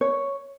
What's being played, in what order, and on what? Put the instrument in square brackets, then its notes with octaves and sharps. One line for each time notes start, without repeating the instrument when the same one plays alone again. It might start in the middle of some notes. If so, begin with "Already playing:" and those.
[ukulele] C#5